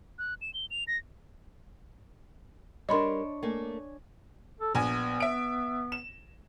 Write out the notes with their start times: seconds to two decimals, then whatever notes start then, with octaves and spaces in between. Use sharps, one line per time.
0.19 F#6
0.41 E7
0.54 G7
0.71 F7
0.87 A#6
2.89 G3 D4 A#4 C#5 D#5 B5 C6
3.43 A3 A#3 G#5
4.61 A4
4.75 A#1 B3 G#5
5.20 E5 D7
5.92 E7